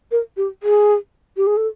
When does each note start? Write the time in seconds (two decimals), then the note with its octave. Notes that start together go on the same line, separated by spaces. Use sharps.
0.12 A#4
0.37 G4
0.63 G#4
1.37 G4
1.47 G#4
1.57 A4